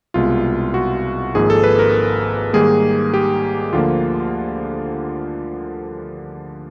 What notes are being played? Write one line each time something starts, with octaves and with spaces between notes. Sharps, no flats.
C2 B2 G#3 F4
F#4
G#1 G#2 F3 A#3 G#4
A4
B4
A#4
G#2 D#3 G3 A#3 G#4
G4
D2 D3 F3 A#3 F4